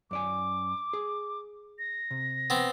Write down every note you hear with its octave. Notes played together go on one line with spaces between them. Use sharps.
F#2 D5 G#5 D6
G#4
A#6
C3
B3 C4